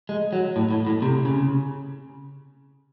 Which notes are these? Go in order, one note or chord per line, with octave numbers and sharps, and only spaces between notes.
G#3
F#3
A2
A2
A2
C3
C#3